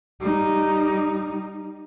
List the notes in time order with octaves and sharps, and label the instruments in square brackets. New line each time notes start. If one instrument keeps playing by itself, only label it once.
[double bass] G3 D#4